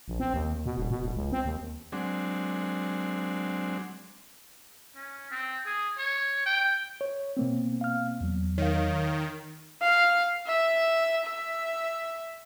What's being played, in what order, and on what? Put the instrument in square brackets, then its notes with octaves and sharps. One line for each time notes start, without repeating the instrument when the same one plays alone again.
[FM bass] A#1
C4
D#2
B2
D#1
B2
D#1
C#2
C4
D#2
[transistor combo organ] F#3 G#3 C4 D4
[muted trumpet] C#4
C4
G#4
C#5
G5
[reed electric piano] C#5
B2 A#3 C4
[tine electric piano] F5 F6
E2 F#3
[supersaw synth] D#3 [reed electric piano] C#5 F5
[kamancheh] F5
E5
E5